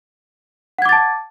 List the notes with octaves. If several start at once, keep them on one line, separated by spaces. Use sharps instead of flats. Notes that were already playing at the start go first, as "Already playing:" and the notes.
F#5 A5 D6 G#6 A6